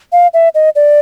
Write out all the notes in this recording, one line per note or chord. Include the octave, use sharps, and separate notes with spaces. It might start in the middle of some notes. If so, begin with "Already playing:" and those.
F5
E5
D#5
D5